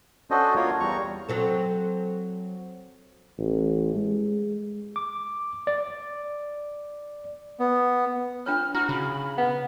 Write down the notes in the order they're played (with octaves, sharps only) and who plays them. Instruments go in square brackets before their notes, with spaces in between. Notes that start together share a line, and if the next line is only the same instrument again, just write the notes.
[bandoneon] C#4 D4 F#4 A4 C5 D#5
A#3 F4 A#4 C#5
E2 G3 A#5 C#6
[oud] F#3 C4 A4
[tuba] A1
G#3
[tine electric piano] D6
D5
[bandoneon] B3
[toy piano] D4 F4 C#5 [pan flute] F6
[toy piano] E4 [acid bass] F#4 [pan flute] F6
[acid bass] C#3 [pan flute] B5
[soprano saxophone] B3